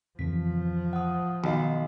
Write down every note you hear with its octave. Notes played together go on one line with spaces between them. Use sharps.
F2 C#3 E3 F3 B6
F#5 D#6
B1 D#3 F#4 D#5 F5